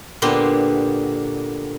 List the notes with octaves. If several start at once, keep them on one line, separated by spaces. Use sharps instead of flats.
A#2 D3 B3 G4 C6